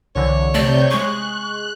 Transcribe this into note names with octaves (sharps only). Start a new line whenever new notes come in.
C2 D3 E3 C#5
C3 A3 D5 G6
G#3 G#4 C#6 F#6